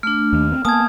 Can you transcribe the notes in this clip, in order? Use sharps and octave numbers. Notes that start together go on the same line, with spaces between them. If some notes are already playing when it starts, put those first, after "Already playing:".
A3 D4 F6
D#2 D#3
C4
A#3 B3 G#5 A5 D#6 G#6